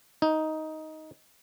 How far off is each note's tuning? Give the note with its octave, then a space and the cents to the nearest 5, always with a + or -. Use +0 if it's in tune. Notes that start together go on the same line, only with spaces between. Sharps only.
D#4 +10